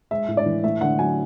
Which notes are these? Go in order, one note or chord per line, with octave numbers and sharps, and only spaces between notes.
G#3 E5
A2
D5
E3
A3 E5
D3 F#5
F#3 G#5